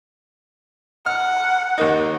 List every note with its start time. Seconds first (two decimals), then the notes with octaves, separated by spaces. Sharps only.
1.06 F#5 F6
1.78 D#2 A#3 D#4